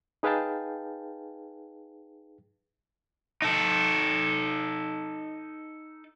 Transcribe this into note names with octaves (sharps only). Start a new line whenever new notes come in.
D#4 G#4 B4 F5 G5 A5
D#4 A4